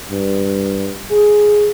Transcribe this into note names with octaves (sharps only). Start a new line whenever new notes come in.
G2
G#4